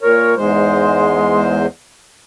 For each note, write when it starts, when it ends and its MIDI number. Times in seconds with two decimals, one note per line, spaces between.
0.02 0.35 46
0.02 0.32 70
0.02 0.35 73
0.37 1.66 40
0.37 1.66 44
0.37 1.63 56
0.37 1.66 72